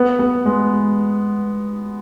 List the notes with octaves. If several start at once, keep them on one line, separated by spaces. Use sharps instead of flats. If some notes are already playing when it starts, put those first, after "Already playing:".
Already playing: B3
B3
G#3